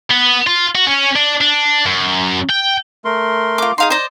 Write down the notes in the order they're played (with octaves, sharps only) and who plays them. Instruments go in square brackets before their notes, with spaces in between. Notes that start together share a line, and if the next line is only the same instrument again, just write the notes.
[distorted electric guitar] B3
F4
F#4
C#4
D4
D4
F#2
G5
[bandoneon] A3 A#4 C6
[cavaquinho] F4 D6
[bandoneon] D#4 [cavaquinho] G#4 F5 C6
[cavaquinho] C5 D5 D#5